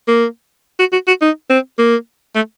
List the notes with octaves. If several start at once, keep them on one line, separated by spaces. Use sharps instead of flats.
A#3
F#4
F#4
F#4
D#4
C4
A#3
A3